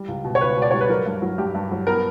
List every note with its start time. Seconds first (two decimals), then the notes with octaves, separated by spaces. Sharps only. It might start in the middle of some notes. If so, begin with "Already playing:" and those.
Already playing: G3
0.08 C#2
0.24 B2
0.35 C#5
0.41 C#2 B4
0.57 B2 D5
0.71 G3 C#5
0.81 B4
0.89 F#3 A#4
1.06 G2
1.22 F#3
1.38 G2 G4
1.54 G2
1.72 F#3
1.87 B3 A#4